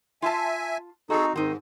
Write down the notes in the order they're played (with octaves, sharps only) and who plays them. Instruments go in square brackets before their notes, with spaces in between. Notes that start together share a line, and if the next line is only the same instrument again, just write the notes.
[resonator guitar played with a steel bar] F4 A5 [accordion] E5 G#5
[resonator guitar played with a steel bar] C4 F#4 [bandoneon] D#4 [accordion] G#4 A4
[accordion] G#2 [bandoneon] D#3 [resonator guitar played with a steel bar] C4 D#4